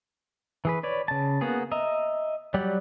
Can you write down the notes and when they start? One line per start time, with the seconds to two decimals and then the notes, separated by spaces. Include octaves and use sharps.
0.65 E3 G#4 B4
0.83 B4 C#5 D5
1.08 C#3 A5
1.41 A#3 B3 F#4 G#4
1.72 D#5 E5 A#5
2.54 F#3 G3 G4 D5 F#5